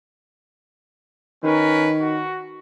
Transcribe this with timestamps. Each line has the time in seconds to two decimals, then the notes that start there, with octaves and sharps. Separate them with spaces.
1.43 D#3 C#4 A#4 B4
2.00 F#4